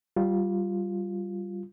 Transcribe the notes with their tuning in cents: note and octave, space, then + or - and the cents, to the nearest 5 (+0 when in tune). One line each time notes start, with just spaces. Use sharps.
G3 -15 F4 +0